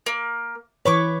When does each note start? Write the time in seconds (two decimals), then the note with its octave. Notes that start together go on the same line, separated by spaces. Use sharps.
0.06 A#3
0.85 E3 B4 C#5 C#6 D6